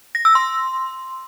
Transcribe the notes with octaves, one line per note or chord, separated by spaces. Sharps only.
A#6
E6
C6